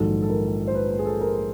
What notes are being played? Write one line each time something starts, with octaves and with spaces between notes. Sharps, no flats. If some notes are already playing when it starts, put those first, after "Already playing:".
Already playing: A#1 G#2 D#3 F#3 A4
A4
A#4
C5
B4
B4
G#4
A4
A#4